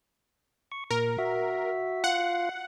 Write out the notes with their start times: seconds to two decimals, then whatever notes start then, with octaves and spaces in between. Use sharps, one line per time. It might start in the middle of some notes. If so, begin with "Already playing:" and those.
0.72 C#6
0.91 A#2 A#4
1.18 F#4 E5
2.04 F4 F5 F#5